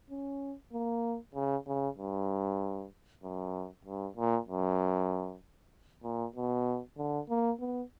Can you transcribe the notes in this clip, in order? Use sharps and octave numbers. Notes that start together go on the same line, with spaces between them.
C#4
A#3
C#3
C#3
G2
F#2
G2
A#2
F#2
A#2
B2
D3
A#3
B3